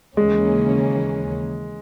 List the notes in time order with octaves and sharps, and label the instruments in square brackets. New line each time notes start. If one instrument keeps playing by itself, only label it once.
[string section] D#2 C#3 E3 A#3 C#4 [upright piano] G#3